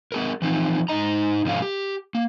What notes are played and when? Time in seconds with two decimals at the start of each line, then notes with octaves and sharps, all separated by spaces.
0.12 B3 G#4 A#4
0.42 E3 F3 C4 D#4
0.88 G#2 C#3 D#4 D#5 A#5
1.45 G#2 C3 F3 C#4 A4 F5
1.62 G4
2.15 A#3